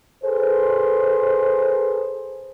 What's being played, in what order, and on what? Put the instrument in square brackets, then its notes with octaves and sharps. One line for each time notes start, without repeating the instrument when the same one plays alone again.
[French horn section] G#4 A4 B4 C5